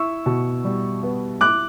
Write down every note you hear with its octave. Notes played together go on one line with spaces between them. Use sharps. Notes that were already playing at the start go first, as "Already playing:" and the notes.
Already playing: E4 C#6 E6
B2
G3
B3
E4 D6 F#6